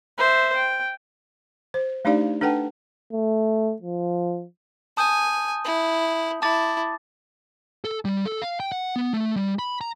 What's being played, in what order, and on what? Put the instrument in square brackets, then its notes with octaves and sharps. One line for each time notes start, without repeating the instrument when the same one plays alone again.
[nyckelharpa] C5 E5
G5
[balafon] C5
A3 D4 D#4 G4 D5 F5
D4 A4 B4 F#5 G5 A5
[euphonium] A3
F3
[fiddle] G#5 [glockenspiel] A5 D#6 G6
[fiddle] E4
[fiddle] E4 [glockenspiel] A5 D6 A6
[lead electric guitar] A4
G3
A4
F5
G5
F#5
B3
A3
G3
B5
A#5